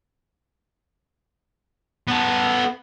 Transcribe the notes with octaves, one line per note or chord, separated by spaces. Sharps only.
B3 A4